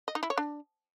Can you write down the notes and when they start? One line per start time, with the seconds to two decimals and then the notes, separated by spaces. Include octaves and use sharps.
0.08 D#5
0.15 D#4
0.23 E4
0.30 C#5
0.38 D4